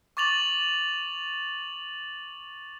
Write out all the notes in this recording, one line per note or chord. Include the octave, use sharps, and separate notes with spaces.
C#6 D6 A6 F7 F#7